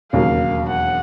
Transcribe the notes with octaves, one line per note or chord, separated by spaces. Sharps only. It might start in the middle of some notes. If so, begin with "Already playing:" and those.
E1 D#2 C#3 F#3 A#3 F5
F#5